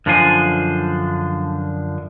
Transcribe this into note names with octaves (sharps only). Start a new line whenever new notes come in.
F#2 D3 F3 D4 C5 G#5